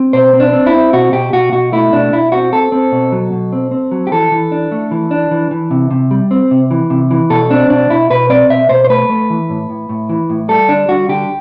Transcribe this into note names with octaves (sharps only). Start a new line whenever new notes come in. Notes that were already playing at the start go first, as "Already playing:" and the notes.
Already playing: C4
B2 C5
C4
D4
C4
E4
C4
B2 F#4
B2 G4
B2 F#4
B2 F#4
A3 E4
B2 D4
B2 E4
C4 F#4
C4 A4
C4
B2
F#3
B2
C4
C4
F#3
G4
E3 A4
E3
D4
A3
E3
D4
E3
E3
C3
C3
G3
C4
C3
E3
C3
E3
B2 A4
C4 D4
B2 D4
B2 E4
B2 B4
C4 D5
B2 E5
B2 C5
C5
A3 B4
A3
E3
A2
A2
A2
E3
A2
G3 A4
D3 D4
G3 F#4
D3 G4